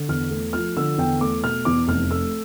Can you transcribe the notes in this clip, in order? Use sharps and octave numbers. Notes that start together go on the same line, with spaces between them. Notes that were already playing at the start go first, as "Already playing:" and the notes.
Already playing: D3
E2 F6
A3
F3 F6
D3 E6
E2 G5
A3 D6
B2 F6
E2 D6
F1 F6
A3 E6